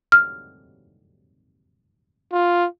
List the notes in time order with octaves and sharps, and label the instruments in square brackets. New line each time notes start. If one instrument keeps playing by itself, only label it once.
[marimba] F6
[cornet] F4